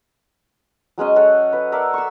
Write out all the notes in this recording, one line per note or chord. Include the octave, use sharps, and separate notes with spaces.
F#3 G#3 C#4 D#5
F#4 A4 C#5 F#5
B4 F#5
A4 A#4 D5 E5
C#6 E6